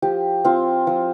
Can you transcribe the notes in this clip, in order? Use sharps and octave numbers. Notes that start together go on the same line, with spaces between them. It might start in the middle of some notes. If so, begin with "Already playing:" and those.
F3 G4
C4 F4
F3